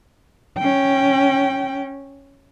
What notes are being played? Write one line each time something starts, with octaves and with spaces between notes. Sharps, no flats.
C#4 G5